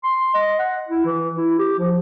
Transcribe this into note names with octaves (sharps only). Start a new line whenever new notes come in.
C6
D#5
F#5
E4
E3
E4
G4
F3